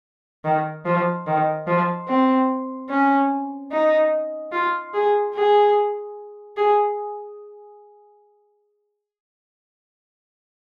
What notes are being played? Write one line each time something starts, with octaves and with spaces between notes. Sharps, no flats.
D#3
F3
D#3
F3
C4
C#4
D#4
F4
G#4
G#4
G#4